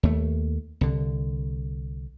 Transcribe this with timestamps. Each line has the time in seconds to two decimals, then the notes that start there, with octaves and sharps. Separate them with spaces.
0.03 D#2 A3
0.81 C2 D3